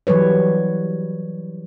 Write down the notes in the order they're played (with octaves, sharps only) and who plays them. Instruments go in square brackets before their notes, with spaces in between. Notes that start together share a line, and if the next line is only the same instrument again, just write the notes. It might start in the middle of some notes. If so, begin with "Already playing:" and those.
[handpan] E3 F#3 G3 B4 C#5